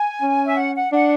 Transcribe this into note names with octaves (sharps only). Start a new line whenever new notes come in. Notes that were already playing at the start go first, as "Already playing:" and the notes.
Already playing: G#5
C#4
E5
F#5
F#5
D4 F#5